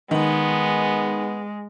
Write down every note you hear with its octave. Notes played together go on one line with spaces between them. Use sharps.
D#3 G#3 B3